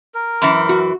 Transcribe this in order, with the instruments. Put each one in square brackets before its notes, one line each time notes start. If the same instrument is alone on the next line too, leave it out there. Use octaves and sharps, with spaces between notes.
[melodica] A#4
[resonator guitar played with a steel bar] F#2 E3
[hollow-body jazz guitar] F#4